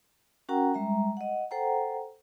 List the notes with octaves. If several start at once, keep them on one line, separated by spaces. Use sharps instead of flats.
C#4 F#4 A#4 F#5 G5 A#5
G3 G#3 E5 A#5
D#5 F#5
A4 C5 F#5 G5 A#5